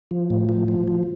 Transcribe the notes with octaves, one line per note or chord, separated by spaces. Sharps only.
F3
A2
F3
F3
F3